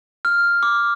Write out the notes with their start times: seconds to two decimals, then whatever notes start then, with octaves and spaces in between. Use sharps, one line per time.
0.25 F6
0.63 D6